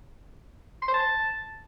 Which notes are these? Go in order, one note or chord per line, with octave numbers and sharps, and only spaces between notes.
C6
C5
A5